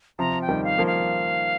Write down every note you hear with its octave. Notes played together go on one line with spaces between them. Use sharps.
C3 F3 A#5
G5
D#3 G3
F5
F3 A#3
F5